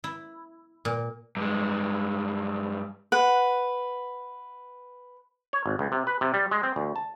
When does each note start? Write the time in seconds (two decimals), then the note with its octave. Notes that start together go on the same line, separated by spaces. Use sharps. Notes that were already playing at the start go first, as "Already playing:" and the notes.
0.04 E4
0.85 A#2
1.37 G2 G#3
3.12 B4 F#5
5.53 C#5
5.66 G#1
5.79 C#2
5.92 C3
6.07 B4
6.21 C3
6.34 G3
6.51 G#3
6.63 C4
6.76 D2
6.96 A5